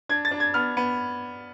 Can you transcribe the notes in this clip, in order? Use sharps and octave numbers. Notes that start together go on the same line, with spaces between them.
D4 G#6
A6
D4
G#6
B3 F6
B3